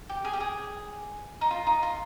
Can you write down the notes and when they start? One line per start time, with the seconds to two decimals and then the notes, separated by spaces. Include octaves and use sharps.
0.09 G4
0.25 G#4
0.33 G4
0.40 G#4
1.41 D#4
1.51 F4
1.67 D#4
1.83 F4